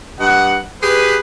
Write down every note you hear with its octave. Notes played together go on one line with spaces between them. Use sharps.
G2 D#5 F#5
G4 G#4 B4